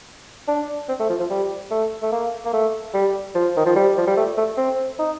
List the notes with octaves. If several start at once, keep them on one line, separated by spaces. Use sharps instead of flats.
D4
C4
A3
F3
F3
G3
A3
A3
A#3
A#3
A3
G3
F3
D#3
F3
G3
F3
G3
A3
A3
C4
D#4